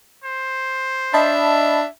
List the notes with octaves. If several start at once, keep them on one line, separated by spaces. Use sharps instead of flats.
C5
D4 D#5 E5 A5 B5